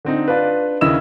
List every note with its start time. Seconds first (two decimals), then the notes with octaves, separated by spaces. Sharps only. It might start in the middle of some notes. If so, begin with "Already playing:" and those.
0.05 D3 C4 D#4
0.28 D4 F4 B4
0.81 D#2 C#3 E4 D#5 E6 E7